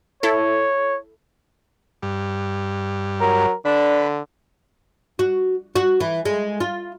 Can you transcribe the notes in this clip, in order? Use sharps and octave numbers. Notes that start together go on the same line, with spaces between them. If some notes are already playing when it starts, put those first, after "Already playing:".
E4 A4 C#5
G2
F#3 A#4
D3 D4 B4
F#4
F#4
E3
G#3
F4